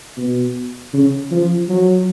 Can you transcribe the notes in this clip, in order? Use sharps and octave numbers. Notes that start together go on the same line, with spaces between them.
B2
C#3
F3
F#3